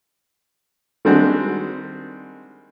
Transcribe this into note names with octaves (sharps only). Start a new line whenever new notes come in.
D#3 G3 G#3 C4 D4 F#4